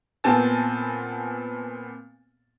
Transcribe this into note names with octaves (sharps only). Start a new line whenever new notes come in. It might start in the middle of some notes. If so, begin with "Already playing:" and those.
A#2 B3 C4 G#5 A5 A6